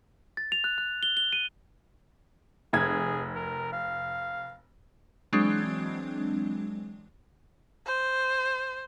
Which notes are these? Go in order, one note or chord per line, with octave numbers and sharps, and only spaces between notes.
A6
F7
F#6
F#6
G7
G7
D#7
F1 G#4 G#6
A#4
F5
E3 F#3 G#3 C4 D4
C5